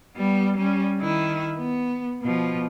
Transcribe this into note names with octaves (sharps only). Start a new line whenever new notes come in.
G3 B3
G3 C#4
D#3 E4
B3
B2 F3